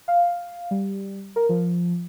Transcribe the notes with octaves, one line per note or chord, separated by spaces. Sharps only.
F5
G3
A#4
F3